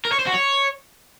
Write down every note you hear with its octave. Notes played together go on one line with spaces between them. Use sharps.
A#4
C#5
C5
F#4
C#5